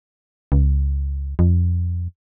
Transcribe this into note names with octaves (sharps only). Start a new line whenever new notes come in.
C#2
F2